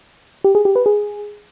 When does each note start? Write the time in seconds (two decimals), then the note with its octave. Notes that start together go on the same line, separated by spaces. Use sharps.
0.44 G4
0.55 G#4
0.65 G4
0.76 B4
0.86 G#4